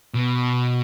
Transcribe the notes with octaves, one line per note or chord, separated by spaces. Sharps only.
B2